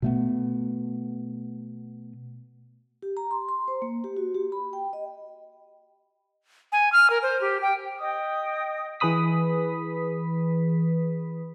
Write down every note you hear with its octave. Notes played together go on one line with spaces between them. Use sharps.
B2 A3 B3
G4
A#5
C6
C6
C5
A#3
G4
F#4
G4
B5
G5
D#5
G#5
F6
A#4
C5
G4
G5
D#5 G5 D#6
E3 G#4 B4 B5 D#6 B6